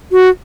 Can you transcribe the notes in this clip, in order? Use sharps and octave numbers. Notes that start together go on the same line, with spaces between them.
F#4